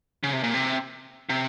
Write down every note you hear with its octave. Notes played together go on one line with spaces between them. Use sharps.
C#3
C3
A#2
C3
C3